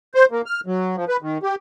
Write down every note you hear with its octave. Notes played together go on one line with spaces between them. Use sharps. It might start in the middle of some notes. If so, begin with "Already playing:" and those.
C5
A#3
F6
F#3
F3
B4
D#3
G4